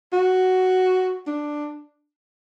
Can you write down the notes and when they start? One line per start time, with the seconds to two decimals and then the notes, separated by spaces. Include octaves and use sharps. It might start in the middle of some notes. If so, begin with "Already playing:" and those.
0.13 F#4
1.27 D4